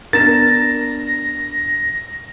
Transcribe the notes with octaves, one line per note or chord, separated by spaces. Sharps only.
B3 D4 A#4 A6 A#6 E7